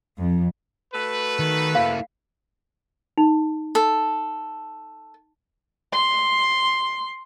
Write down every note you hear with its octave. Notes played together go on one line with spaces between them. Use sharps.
F2
A3 F#4 B4
D#3
A#3 E4 F5
D#4
A4
C6